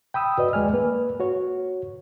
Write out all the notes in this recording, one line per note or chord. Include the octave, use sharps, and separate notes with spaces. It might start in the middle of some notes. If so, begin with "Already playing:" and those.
G5 B5 D#6 E6
F#4 B4 D5 D#5
D#2 G#3 D5 G#5 F6
A#3 B4
F#4 C#5